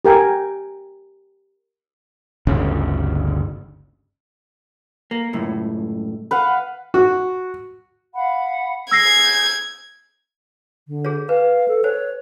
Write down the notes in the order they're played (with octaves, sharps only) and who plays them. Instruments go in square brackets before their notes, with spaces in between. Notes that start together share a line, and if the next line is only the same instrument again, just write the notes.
[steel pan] G4 A#4 G5 G#5
[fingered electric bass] G1 D2 C#3
[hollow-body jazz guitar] A#3
C#2 F#2 A2
[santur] B4 F5 F#5
[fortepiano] F#4
[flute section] F5 F#5 B5
[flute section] G#4 G6 [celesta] E6 A#6 C7 [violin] G#6
[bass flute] D3
[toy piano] G#4 C#5
[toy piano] B4 [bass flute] F5
[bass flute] A4
[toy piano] C5 [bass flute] C#5